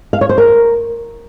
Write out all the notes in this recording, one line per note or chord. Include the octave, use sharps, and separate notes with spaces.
F5
C#5
C5
A#4